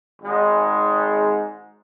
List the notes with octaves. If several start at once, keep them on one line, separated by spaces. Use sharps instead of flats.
G#1 G#2 G#3